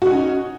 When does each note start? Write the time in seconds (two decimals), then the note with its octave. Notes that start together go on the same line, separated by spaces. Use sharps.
0.02 F#4
0.06 D#4
0.10 C#4